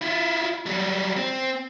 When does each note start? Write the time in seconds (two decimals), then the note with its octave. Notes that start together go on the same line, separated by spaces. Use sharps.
0.01 E4 F4
0.66 F#3 G3
1.16 C4